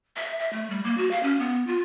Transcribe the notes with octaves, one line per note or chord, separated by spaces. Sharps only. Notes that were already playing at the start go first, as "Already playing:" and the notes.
E5
E5
A3
G3
A#3
F#4
F5
C#4
B3
F4